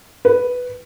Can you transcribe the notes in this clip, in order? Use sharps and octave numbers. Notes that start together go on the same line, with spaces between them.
B4